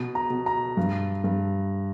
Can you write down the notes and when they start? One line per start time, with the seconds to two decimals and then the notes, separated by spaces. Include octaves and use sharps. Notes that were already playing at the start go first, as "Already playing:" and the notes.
Already playing: B2
0.15 A#5
0.30 B2
0.46 A#5
0.77 G2
1.24 G2